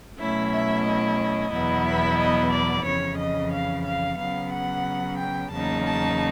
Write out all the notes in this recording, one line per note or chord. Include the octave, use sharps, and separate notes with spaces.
B2 F#3 A3 C#4 E4 E5
E5
D#5
E2 B2 F#3 B3 E4
E5
D#5
D5
F2 C#3 E3 C#5
D#5
F5
F5
C#3 F#3 B3 F5
F#5
G5
E2 C#3 F#3 A#3 D#4 A5
A5